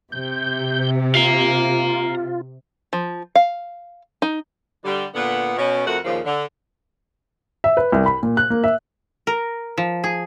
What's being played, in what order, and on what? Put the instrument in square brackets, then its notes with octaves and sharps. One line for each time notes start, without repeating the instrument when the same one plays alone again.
[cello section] C3 [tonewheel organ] G6
[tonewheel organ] F4 [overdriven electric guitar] F5 A#5
[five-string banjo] F3
F5
D#4
[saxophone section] D3 G3
A#2 D3 B3
B2 C#4
F2 A3 F#4 A#4 F#5
D#2 A#2 C#3 F3
D3
[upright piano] E5
B4
C2
B5
A#2
F#6
A#3
E5
[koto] A#4
F3
G#4